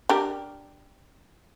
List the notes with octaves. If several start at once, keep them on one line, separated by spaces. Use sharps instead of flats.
D4 G4 A#4